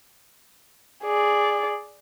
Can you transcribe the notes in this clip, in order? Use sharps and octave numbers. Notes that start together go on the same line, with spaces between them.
G#4 D5